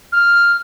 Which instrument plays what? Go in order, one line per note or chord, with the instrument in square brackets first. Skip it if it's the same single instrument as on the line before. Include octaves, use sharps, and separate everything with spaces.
[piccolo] F6